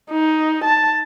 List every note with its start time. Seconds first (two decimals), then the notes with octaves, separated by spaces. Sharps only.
0.11 D#4
0.65 A5